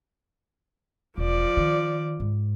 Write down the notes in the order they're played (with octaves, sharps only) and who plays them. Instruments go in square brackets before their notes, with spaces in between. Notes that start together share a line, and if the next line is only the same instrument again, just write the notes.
[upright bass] E1 [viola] F3 D5
[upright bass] D#3
G#2